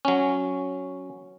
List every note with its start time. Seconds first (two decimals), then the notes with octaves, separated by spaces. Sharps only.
0.05 F#3 C#4